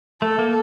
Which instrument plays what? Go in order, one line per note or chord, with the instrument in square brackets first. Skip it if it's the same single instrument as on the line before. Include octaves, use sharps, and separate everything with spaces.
[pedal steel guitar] A3 [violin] A4
[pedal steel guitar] A#3